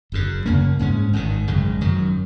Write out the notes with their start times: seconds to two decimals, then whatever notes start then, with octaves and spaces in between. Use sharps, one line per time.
0.12 F#1 F#2 C#3
0.45 F#2 C#3 A#3 C#4
0.79 G#2 G#3 C#4
1.13 G#1 G#2 D#3
1.47 G#1 F#2 C#3 G#3
1.81 F#2 D#3 F#3